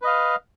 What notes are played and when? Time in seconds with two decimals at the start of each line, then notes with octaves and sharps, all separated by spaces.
0.02 B4
0.04 D#5
0.07 F5